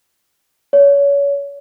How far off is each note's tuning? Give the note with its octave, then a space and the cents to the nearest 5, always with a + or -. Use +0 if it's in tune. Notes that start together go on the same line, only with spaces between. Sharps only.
C#5 +30